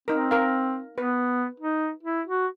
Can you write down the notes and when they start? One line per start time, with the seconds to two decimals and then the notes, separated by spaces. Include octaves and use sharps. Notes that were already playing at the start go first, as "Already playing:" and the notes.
0.08 C4 D#4 A#4
0.31 A#4 F5
0.98 B3 B4
1.60 D#4
2.03 E4
2.27 F#4